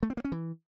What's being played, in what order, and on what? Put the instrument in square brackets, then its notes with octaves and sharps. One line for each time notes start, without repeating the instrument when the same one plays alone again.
[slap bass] A3
C4
A#3
C#4
E3